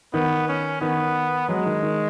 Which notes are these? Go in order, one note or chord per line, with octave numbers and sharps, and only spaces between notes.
D#3 B3
C#4
D#3 B3
F#3 G#3
D#3
D#3